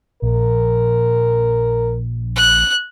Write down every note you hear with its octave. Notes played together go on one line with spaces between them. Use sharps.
A#1 A#4
F#6